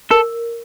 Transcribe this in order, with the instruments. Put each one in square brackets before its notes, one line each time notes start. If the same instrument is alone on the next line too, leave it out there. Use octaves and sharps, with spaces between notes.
[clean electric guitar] A4 [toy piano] A#4